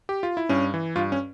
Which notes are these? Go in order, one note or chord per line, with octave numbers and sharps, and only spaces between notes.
G4
F4
E4
G2 C#4
E3
G2 F4
C#4